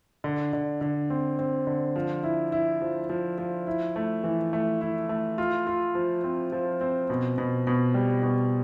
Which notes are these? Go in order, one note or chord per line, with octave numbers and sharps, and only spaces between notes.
D3
D3
D3
C4
C4
D3
F3
E4
E4
F3
F3
F3
E4
A3
E3
A3
E4
A3
F4
F4
F3
C4
F3
C4
B2
B2
B2
G3
B2